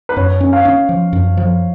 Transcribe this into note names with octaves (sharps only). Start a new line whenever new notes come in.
B4
F#2 C#5
C#4
F5
C#4
F3
F#2
F3